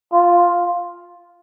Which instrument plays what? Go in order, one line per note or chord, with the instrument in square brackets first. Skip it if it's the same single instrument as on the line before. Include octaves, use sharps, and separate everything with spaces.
[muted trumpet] F4